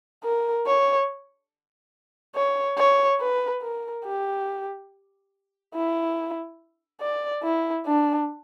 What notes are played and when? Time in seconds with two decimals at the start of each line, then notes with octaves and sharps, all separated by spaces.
0.24 A#4
0.66 C#5
2.35 C#5
2.78 C#5
3.20 B4
3.62 A#4
4.05 G4
5.74 E4
7.01 D5
7.43 E4
7.86 D4